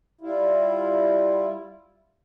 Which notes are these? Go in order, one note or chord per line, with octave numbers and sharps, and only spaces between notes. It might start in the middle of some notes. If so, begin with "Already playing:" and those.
G3 E4 F4